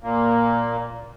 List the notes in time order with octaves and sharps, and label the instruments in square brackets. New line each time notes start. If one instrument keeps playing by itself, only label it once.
[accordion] A#2 A#3